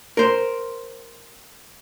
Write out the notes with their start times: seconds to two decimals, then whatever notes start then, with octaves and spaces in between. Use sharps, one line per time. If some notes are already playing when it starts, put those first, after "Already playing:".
0.17 A#4 C5